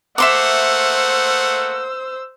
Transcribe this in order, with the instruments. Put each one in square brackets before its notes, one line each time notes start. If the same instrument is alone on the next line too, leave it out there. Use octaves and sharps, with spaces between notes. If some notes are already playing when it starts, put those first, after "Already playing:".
[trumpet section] A3 A#3 F#5 [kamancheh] C5 E6 [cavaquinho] E5 C6 D6